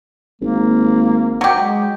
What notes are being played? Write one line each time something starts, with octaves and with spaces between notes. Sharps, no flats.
G#1 A#3
F#3 G4
G#3